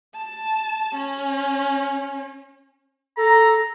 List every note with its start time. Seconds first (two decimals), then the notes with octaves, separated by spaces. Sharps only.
0.15 A5
0.95 C#4
3.17 A4 A#5